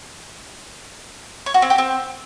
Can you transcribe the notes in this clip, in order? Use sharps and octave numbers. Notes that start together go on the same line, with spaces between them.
C#5
F#4
C4
G4
C4